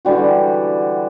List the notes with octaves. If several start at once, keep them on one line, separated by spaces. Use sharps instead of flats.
D3 E3 G3 F#4